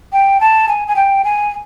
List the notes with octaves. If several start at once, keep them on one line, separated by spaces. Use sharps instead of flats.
G5
A5
G#5
G#5
G5
G#5